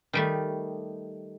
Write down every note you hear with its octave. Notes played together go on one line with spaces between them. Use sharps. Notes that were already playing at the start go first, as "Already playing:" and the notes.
D#3 G3 A3